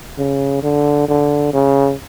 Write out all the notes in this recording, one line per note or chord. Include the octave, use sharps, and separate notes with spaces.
C#3
D3
D3
C#3